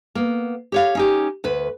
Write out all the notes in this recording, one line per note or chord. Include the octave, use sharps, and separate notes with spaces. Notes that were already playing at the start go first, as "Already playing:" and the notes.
A#3 B3
G4 C#5 F5
C#4 D#4 G4
D2 B4